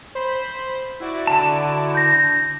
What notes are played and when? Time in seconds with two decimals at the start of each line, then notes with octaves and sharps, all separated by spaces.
0.15 C5 B5
1.00 E4 F#4 D5
1.27 D3 A5
1.95 G6 A#6